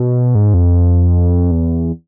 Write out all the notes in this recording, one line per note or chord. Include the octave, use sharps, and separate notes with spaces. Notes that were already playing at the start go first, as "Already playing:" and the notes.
Already playing: B2
G#2
F2
E2